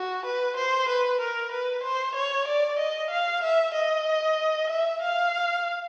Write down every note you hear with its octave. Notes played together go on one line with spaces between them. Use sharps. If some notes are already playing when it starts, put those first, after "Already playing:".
Already playing: F#4
B4
C5
B4
A#4
B4
C5
C#5
D5
D#5
F5
E5
D#5
E5
F5